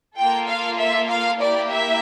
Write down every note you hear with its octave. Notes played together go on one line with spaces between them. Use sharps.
A#3 F4 A4 G5
F5
E5
F5
A#3 E4 G4 D5
E5